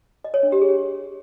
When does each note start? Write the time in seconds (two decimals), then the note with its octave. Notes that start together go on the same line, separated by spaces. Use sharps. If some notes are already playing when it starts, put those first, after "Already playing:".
0.24 D#5
0.34 C#5
0.43 D4
0.52 G4
0.62 G#4